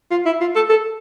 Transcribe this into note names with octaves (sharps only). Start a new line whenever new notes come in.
F4
E4
F4
A4
A4